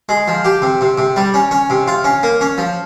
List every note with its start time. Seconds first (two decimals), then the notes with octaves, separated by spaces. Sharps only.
0.09 G#3
0.28 F3
0.45 G4
0.62 C3
0.81 C3
0.98 C3
1.16 G3
1.34 C#4
1.51 C#4
1.70 C3
1.88 F4
2.04 C#4
2.23 A#3
2.41 C#4
2.58 F3